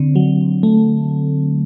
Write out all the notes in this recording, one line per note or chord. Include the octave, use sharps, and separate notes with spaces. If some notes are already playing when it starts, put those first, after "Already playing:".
Already playing: D3 C4
F#3
A3